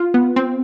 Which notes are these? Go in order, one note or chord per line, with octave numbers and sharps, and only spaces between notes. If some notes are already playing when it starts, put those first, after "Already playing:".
Already playing: F4
B3
C4